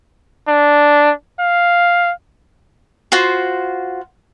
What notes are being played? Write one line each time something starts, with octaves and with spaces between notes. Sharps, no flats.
D4
F5
F4 F#4 C5